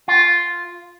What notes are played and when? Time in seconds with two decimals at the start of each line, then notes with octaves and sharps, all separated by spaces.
0.08 F4